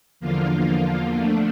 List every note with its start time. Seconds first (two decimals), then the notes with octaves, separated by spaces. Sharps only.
0.20 E2 D3 F3 A#3 F4
1.19 D3 F3 A3 D4